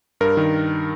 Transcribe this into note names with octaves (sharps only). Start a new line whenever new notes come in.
G2 A#4
D#3